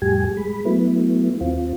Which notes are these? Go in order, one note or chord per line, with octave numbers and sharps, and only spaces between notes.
F2 A2 G3 G4 G#5
G#3 B5
F#3 A3 B3 E4
D#2 C4 F4